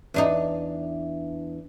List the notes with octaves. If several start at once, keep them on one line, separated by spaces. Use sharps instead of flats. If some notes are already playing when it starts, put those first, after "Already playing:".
E2 D4 D#4